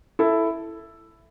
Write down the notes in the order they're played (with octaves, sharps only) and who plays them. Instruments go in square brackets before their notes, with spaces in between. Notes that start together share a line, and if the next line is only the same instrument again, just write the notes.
[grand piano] E4 A4